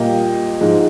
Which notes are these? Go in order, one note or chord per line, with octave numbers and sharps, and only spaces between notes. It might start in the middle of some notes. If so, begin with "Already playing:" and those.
Already playing: A#2 G3 A#3 D#5 G5
G#2 F3 G#3